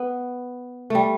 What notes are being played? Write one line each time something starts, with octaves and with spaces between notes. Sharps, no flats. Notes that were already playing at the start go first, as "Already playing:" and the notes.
Already playing: B3
G3 A3